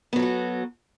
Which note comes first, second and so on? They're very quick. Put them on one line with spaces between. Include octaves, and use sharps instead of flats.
B3 F#3 A4 F#4